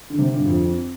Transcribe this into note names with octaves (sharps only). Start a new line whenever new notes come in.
D3
C3
D3
G2
F2